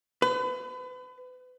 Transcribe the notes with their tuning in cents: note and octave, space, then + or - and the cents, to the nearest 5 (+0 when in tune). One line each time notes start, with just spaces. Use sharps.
B4 +35